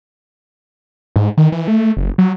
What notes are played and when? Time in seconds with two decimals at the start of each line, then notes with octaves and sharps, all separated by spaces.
1.16 G#2
1.37 D#3
1.52 E3
1.68 A3
1.97 F#1
2.18 F#3